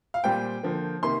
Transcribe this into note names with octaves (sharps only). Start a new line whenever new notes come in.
F5
A#2 G3 C4 G5
D3 F3 A#3
C3 D#3 A#3 C6